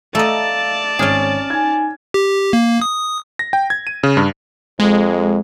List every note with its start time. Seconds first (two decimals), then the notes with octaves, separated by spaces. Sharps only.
0.15 A3 D5 D#5 F5 A5 A#5 E6
0.99 G#1 C#4 G#4 C#5 F6 D7
1.50 D#4 G#5 G#6
2.14 G4
2.53 A#3
2.81 D#6
3.39 A#6
3.53 G5
3.70 G#6
3.87 D#7
4.03 C#3
4.17 G2
4.80 F2 G#3